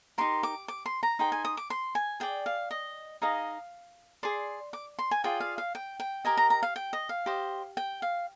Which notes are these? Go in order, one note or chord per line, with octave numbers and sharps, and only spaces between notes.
D#4 G4 A#4 C6
D6
D6
C6
A#5
D#4 G#4 C5 G5
G#5
D#6
D6
C6
G#5
G#4 D5 G5
F5
D#5
D#4 G#4 D#5 F5
G#4 D5 C6
D6
C6
G#5
F4 G#4 D5 G5
F5
F5
G5
G5
G4 A#4 D#5 G#5
A#5
A#5
F5
G5
D#5
F5
G4 C5 D#5
G5
F5